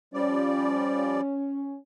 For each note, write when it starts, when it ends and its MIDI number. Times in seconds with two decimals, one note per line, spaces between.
0.14 1.21 53
0.14 1.21 55
0.14 1.76 61
0.14 1.21 74